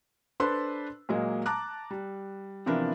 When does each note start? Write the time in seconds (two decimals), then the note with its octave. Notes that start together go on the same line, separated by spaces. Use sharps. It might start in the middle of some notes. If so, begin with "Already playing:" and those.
0.40 D4 A4 B4 C5 C6
1.09 A#2 F#3 G#3 A#3 D#5
1.46 A5 A#5 D6 F#6
1.91 G3
2.66 C3 E3 F3 B3 D4 A#4